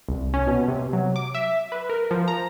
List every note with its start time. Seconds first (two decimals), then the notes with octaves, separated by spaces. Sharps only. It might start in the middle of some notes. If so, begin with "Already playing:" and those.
0.09 C2
0.34 C#4
0.47 B2
0.68 C3
0.93 F#3
1.16 D6
1.35 E5
1.72 B4
1.90 A#4
2.11 F3
2.28 A#5